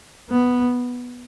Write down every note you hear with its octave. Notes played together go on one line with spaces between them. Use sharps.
B3